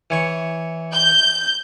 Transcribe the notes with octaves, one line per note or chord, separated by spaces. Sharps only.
E3 C#5 C#6
G6